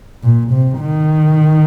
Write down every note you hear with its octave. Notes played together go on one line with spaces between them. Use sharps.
A#2
C3
D#3